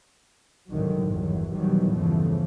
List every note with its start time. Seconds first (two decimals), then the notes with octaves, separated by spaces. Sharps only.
0.69 C2 G#2 D3 D#3 F#3
1.08 G1 E2 D#3 E3 F#3
1.51 B2 D#3 E3 F#3 G3
1.91 E2 G2 C#3 E3 F3 A3